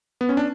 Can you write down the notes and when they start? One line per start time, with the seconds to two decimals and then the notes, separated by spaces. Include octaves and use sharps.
0.21 B3
0.29 C#4
0.37 D4